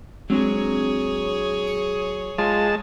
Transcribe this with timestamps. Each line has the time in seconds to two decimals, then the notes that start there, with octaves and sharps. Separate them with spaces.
0.30 F#3 G#3 C4 D4 G#4 C#5
1.67 C#7
2.38 G#3 F4 A5